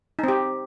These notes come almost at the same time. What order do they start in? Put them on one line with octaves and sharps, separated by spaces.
D#4 C4 G4